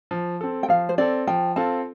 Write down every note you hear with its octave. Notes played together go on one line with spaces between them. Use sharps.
F3
C4 A4
G5
F3 F5
C5
C4 A4 D5
F3 G5
C4 F4 A4 A5